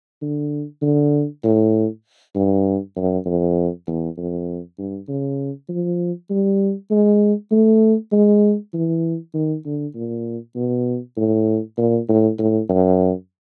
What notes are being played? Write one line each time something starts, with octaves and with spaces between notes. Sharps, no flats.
D3
D3
A2
G2
F#2
F2
E2
F2
G2
C#3
F3
G3
G#3
A3
G#3
E3
D#3
D3
A#2
B2
A2
A#2
A2
A2
F#2